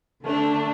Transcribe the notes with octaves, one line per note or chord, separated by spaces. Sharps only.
D3 A3 D4